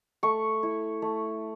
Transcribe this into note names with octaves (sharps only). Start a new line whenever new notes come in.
A3 C#6
E4
A3